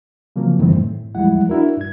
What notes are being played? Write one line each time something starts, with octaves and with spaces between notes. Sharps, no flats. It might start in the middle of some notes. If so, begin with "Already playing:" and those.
C#3 F3 F#3 A#3 C4
F#2 D#3 E3 G3 A3 C4
A2
E2 F3 G3 G#3 E4 F#5
D4 E4 F#4 A#4
G2 G#6